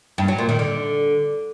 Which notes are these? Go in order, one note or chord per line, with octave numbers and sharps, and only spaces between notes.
G2
F#3
A#2
D#3
D3